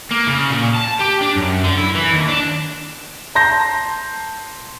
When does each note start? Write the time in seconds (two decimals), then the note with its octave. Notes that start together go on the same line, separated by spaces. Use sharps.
0.11 A#3
0.27 C#3
0.50 A#2
0.75 A5
0.99 G4
1.21 D4
1.35 F#2
1.63 D3
1.78 E4
1.95 E3
2.12 D#2
2.29 D4
3.35 A5 A#5 C6 G6 A#6